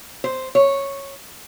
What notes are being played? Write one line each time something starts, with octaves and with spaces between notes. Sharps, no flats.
C5
C#5